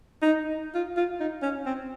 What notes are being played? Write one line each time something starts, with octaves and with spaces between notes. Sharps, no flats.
D#4
F4
F4
D#4
C#4
C4